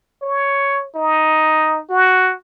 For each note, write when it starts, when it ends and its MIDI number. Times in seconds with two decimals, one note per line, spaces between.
0.22 0.85 73
0.95 1.80 63
1.90 2.34 66